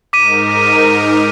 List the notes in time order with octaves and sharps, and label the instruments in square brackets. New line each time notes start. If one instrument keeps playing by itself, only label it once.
[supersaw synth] G#2 D#4 A#4 [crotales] D6 B6 D#7